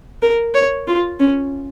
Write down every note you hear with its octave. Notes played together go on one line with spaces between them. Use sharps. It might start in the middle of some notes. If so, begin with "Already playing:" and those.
A#4
C#5
F4
C#4